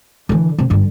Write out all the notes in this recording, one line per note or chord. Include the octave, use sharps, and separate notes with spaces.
D3 E3
C3
G2 D3